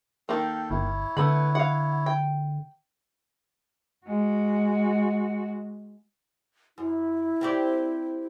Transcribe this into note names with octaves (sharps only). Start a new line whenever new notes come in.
D#3 G#3 A#3 A4 G5
G1 E4 C#5
D3 A3 B3 B5
F5 F#5
G5
G#3 F#4
F#2 E4
C4 G4 D5